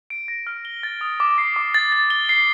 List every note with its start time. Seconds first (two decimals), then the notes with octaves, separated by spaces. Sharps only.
0.10 D7
0.28 A#6
0.47 F6
0.65 G7
0.83 A6
1.01 D#6
1.20 D6
1.38 C7
1.56 D6
1.74 A6
1.92 A6
2.10 G7
2.29 C7